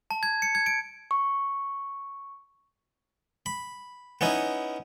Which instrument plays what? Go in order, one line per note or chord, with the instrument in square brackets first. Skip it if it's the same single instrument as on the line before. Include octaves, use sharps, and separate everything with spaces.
[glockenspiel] A5
G#6
C#7
G#6
D7
[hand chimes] C#6
[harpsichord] B5
B3 C#4 D#4 E4